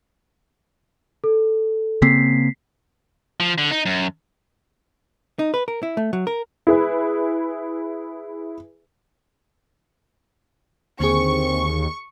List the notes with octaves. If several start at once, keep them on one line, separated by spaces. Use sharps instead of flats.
A4
C#3 A#3 C4 B6 C7
F3
D3
D#4
F#2
D#4
B4
A#4
E4
A3
F#3
A#4
E4 G#4 B4
D#2 D3 C4 G#4 C#6